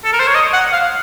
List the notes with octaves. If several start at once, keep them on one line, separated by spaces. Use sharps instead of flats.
A4
A#4
C5
C#5
D#5
F#5
F5